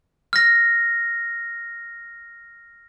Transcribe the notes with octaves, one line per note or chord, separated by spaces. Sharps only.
F6 A#6